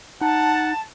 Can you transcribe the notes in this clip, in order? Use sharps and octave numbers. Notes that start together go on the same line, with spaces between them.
D#4 F#5 A5